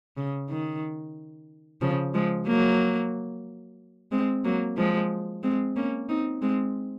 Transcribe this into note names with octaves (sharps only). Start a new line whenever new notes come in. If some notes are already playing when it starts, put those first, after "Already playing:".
C#3
D#3
C#3 F3
F3 G#3
F#3 A#3
G#3 C4
F#3 A#3
F3 G#3
G#3 C4
A#3 C#4
C4 D#4
G#3 C4